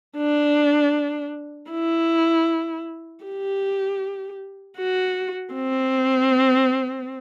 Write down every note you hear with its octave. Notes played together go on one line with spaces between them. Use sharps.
D4
E4
G4
F#4
C4